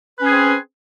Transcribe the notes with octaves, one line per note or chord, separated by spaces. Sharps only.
C4 C#4 G#4 B4